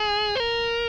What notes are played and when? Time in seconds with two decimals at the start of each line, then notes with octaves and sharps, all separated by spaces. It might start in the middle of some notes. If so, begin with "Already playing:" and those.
Already playing: G#4
0.35 C5
0.40 A#4